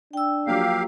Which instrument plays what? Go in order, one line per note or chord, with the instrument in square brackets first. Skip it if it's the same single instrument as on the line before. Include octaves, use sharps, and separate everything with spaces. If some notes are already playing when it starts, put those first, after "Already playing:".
[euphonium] D4 [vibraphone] G5 E6
[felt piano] F3 F#3 A#3 [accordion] G4 F5